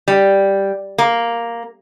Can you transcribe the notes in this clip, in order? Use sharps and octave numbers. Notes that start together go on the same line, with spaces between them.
G3
A#3